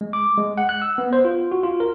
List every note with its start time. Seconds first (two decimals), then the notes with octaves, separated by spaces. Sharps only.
0.01 G#3
0.13 D6
0.37 G#3
0.58 F#5
0.69 F#6
0.82 E6
0.98 B3
1.13 C5
1.25 F4
1.52 F#4
1.63 F4
1.80 A#4